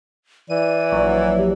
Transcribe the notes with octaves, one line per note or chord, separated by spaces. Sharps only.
E3 D5 D#7
A#1 F#3
G4